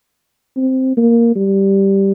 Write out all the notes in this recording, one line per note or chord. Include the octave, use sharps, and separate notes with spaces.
C4
A#3
G3